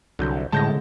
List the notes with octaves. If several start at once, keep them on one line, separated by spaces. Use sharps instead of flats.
C2 D3 F#3 G6
C2 A2 D3 G#3 A5 G6 A#6